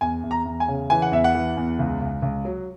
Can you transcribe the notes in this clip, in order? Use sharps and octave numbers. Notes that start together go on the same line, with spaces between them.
E2 G#5
E2
A#5
E2
G#5
C#3
E3 G#5
F#5
E2 E5
F#5
E3
E2
C#2
C#2
C#2
F#3